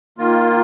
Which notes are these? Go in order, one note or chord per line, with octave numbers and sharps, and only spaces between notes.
D#3 A#3 F4